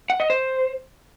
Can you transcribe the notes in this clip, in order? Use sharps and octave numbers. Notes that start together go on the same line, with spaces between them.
F#5
D#5
C5